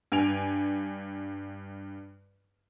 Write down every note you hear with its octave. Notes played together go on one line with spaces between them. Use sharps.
G2 G#5 D7 F7